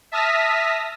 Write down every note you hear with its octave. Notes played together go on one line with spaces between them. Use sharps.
E5 A5 D#6 F6 A#6 B6